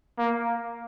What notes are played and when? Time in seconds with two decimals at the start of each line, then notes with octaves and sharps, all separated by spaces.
0.18 A#3